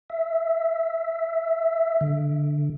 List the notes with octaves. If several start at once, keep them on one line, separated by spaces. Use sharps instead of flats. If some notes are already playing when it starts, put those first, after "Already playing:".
E5
D3